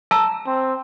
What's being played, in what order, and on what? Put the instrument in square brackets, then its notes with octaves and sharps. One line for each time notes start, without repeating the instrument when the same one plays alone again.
[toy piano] A5 A#5 E6
[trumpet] C4